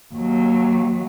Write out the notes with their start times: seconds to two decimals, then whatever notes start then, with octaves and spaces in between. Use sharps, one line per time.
0.15 D#2 F#3